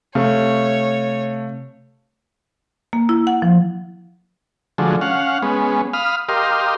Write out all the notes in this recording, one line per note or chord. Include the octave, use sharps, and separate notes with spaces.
C3 A3 C#5 F5
A#3
E4
F#5
F3
D3 F3 F#3 G#3 A3
C#4 F5 F#5
G#3 B3 C#4
F5 B5 D#6 F6
G4 A#4 D#5 F5 C6